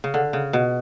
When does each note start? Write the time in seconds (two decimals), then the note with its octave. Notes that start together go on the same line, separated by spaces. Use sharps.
0.04 C#3
0.14 D3
0.33 C#3
0.53 B2